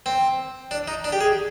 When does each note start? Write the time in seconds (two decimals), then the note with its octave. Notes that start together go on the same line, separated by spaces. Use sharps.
0.06 C4
0.71 D4
0.88 D#4
1.04 D4
1.12 G4
1.21 G#4